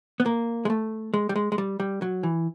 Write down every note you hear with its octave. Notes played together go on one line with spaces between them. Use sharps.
B3
A#3
G#3
A3
G#3
G3
G#3
G#3
G3
G3
F#3
E3